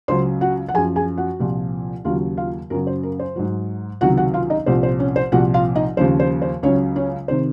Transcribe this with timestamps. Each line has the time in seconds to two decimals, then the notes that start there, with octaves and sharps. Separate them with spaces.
0.08 C#2 C#3 F#3 C5 C6
0.41 F#4 F#5
0.69 F#5
0.74 F3 G#4 G#5
0.78 F#2
0.96 G#4 G#5
1.18 F#4 F#5
1.40 C2 A#2 F3
2.05 D#2 C#3 F#3 F4 F5
2.38 F4 F5
2.70 F#2 C#3 F#3 A#4
2.87 C5
3.03 A#4
3.19 C5
3.36 G#2 F#3
4.01 C#2 C3 D#3 F#3 F#4 F#5
4.17 F#4 F#5
4.34 F4 F5
4.50 D#4 D#5
4.66 C2 A#2 F3 C5
4.83 C5
4.99 C#4 C#5
5.16 C5
5.32 C2 A#2 F3 F#4 F#5
5.54 F4 F5
5.76 D#4 D#5
5.97 D#2 C#3 F3 C5
6.20 C5
6.42 C5
6.63 C#2 C#3 F#3 C#4 C#5
6.96 C#4 C#5
7.28 C3 D#3 C5